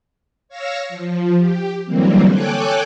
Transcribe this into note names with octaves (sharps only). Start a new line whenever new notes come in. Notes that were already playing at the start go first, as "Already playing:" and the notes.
C#5 F5 C#6 E6 A#6
F3
G4
D3 E3 F#3 G3 A#3 C4
A4 C#5 G5 G#5 D6 F#6